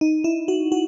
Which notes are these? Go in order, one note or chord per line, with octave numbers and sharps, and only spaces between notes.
D#4
E4
F#4
F#4